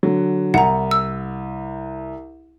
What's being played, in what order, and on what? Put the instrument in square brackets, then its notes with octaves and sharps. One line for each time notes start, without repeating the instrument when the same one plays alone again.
[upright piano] D3 F#3
[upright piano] C2 [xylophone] F#5 A#5
[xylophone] E6